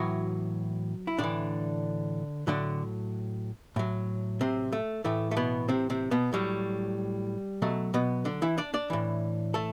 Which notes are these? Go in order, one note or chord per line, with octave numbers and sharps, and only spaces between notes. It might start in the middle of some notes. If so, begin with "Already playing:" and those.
Already playing: A2 E3 F#3 F#4
E4
A2 D3 E3 D4
A2 D3 F#3 D4
A2 F#3
C3 C4
A3
A2 E3 A3
A3
B2 B3
C3 C4
C3 C4
B2 B3
A2 F#3 G3
B2 F#3 A3
B2 B3
D3 D4
E3 E4
D4 D5
D4 D5
A2 E3
A3 A4